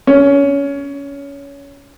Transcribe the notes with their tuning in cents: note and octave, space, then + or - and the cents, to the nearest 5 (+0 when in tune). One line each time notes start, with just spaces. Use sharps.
C#4 +20